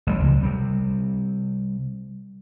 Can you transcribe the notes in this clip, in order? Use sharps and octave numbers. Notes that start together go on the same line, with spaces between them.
A1 G3
C#2 C3 D#3 F#3
C3 G3